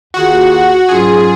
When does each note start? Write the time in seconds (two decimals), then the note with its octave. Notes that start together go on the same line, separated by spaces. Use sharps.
0.14 D#2 D#3 A#3 F4 F#4 G#4
0.88 G#2 F#3 C#4 F4 G#4